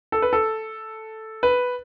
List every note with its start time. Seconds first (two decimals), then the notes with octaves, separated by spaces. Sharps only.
0.12 A4
0.22 B4
0.33 A4
1.43 B4